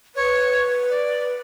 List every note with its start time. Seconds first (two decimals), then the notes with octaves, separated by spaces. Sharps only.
0.15 B4 C#5
0.90 D5